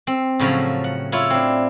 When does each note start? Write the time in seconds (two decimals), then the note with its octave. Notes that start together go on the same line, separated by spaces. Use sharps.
0.07 C4
0.40 A2 C#3 F3 F#3
0.84 F#5
1.12 E4 F4 C#5
1.30 C4 D4